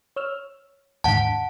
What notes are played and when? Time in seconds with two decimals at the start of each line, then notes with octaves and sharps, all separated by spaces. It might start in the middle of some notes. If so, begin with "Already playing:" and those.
0.16 C#5 E6 F6
1.04 D#2 G#2 D3 F#5 A5